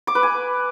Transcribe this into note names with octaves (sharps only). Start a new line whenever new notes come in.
D6
B4
G#5